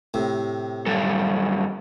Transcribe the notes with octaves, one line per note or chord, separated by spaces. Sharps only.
A2 C3
F#2 G3 A4